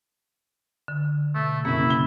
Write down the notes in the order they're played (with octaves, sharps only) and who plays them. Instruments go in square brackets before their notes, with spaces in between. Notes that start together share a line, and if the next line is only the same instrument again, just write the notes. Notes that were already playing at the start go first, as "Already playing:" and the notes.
[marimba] D3
[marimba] B2 [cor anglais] A3
[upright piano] F#1 [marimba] A#3 C#4 [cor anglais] E4
[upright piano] G7